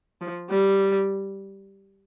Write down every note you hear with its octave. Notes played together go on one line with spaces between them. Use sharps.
F3
G3